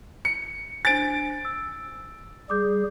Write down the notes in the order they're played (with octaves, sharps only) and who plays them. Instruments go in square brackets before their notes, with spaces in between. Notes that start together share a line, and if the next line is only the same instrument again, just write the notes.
[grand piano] C#7
[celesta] D4 C5 G#5 [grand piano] A6 D7
[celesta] E6
[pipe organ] G3 G#4 [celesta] D6 G6